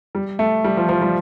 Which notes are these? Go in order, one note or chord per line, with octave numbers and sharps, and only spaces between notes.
G3
A3
G3
F3
F3
G3